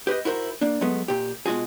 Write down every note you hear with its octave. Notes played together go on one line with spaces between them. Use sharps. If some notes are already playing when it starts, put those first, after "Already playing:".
G4 B4 C5 D#5
E4 F#4 A#4 C5
A#3 D4
F#3 G#3 A3 B3
A#2 G4
B2 G#3 F4 F#4 G#4